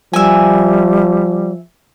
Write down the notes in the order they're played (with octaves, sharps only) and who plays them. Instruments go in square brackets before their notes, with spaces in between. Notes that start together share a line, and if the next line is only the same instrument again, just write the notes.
[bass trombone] F3 [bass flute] G3 [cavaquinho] E5 G#5